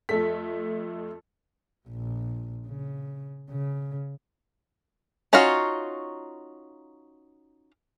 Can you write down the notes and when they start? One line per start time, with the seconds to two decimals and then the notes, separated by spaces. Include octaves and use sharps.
0.09 F2 A3 A4 B6
1.88 A#1
2.66 C#3
3.50 C#3
5.33 C#4 D#4 F4 F#4 F5